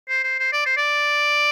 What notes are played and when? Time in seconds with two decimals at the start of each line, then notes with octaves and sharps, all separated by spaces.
0.08 C5
0.23 C5
0.39 C5
0.53 D5
0.66 C5
0.77 D5